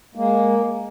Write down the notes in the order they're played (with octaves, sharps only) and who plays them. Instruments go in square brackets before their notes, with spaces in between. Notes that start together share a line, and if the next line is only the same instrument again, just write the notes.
[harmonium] G#3 A#3